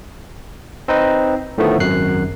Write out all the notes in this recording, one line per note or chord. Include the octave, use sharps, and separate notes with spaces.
C4 D#4 B4 D#5
A2 D3 D#3 F3 A3 B3
G#1 F#2 F#6 C7